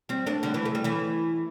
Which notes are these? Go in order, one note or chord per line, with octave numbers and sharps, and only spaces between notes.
G3 C4
A3 D4
D3 G3
E3 A3
A3
G3
E3 A3